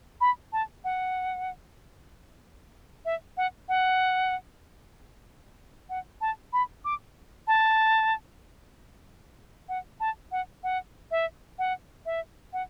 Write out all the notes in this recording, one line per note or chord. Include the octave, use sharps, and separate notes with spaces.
B5
A5
F#5
E5
F#5
F#5
F#5
A5
B5
D6
A5
F#5
A5
F#5
F#5
E5
F#5
E5
F#5